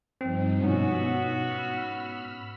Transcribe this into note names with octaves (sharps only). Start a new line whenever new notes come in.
G2 F3 C4 D#4
G#2 B2 B3 C#4 F#4 E6
B5 E6 F6